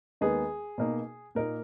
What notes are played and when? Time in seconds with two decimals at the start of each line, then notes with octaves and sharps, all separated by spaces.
0.21 D#2 D#3 G#3 B3 D#4 G#4
0.78 B2 A#3 D#4
1.35 A#2 A#3 D#4 A#4